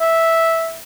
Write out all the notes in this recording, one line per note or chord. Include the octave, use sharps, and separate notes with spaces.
E5